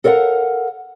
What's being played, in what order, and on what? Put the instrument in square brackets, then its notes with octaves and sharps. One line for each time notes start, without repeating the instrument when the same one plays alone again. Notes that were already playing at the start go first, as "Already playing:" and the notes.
[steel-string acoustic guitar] A4 A#4 D5 F5 F#5